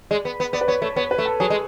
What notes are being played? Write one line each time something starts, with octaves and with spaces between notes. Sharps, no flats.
G#3 D5
B3
B3
B3 D5
B4
B3 C#5
A3 C#5
B3 C#5
B4
A3
A4
F#3 G#4
G#3